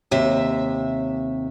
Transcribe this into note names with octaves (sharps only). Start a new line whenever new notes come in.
D#2 C3 E5